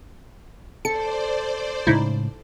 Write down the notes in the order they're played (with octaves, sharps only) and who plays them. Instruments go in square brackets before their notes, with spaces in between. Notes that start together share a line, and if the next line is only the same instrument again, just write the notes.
[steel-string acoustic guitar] A4 [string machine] C5 D5 [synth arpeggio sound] C#7
[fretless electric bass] A2 C#3 G#3 [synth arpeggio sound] D#4 E4